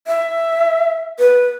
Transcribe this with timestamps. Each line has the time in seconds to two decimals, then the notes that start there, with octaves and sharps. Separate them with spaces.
0.07 E5
1.19 B4